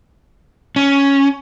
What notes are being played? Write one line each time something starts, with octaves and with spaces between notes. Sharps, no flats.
C#4